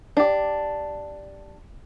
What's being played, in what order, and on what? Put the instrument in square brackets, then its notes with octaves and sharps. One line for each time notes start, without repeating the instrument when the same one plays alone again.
[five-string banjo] D4 G4